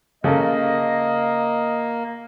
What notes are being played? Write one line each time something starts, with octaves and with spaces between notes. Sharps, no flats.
C#3 A#3 A4 A#4 D#5